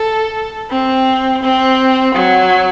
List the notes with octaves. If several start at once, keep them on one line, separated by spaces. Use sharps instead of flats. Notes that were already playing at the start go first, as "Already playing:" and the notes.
Already playing: A4
C4
C4
F#3